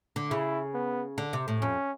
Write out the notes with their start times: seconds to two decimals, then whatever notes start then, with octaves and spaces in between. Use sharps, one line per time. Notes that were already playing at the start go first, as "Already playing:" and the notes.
0.16 D3
0.31 C#3 E4
0.74 B3
1.18 D3
1.33 C3
1.48 A2
1.61 F2 C#4